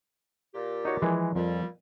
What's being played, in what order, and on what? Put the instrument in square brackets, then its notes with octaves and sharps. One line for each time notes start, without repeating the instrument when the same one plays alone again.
[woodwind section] A#2 G4
[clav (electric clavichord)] D#4 F#4 C#5
[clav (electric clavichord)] E3 G#3 [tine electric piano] F3
[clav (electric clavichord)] F2 [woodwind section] A#2 G3